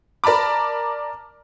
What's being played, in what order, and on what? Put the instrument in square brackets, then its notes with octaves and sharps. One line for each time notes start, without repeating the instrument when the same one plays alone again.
[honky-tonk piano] A#4 D5 A5 B5 D6